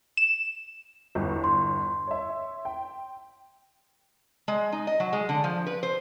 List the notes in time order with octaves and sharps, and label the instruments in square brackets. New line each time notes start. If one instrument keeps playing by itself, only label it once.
[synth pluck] E7
[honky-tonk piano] G1 E2
[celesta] C6
[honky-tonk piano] C#5 E5
G5
[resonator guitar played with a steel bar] G#3
D#4
D#5
F#3
G#3
D3
F3
B4
C5